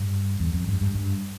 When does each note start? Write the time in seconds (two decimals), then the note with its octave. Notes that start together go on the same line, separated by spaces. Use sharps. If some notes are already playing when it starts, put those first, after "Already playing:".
Already playing: G2
0.40 E2
0.54 F2
0.68 G2
0.81 G2
0.95 G2